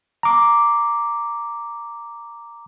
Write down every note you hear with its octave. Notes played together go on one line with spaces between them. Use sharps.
A#5 D6